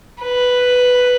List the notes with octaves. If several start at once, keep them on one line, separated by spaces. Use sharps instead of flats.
B4